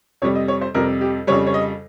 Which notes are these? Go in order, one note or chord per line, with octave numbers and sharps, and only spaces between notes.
F2 C3 G3 C#5
D#5
C#5
C5
F2 C3 G3 A#4
G4
F2 C#3 G3 C#5
C#5
D#5